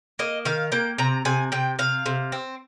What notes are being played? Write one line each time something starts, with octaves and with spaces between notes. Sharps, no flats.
A#3 D#5
D#3 F5
A#3 G5
C3 A#5
C3 G#5
C3 G5
C3 F5
C3
C4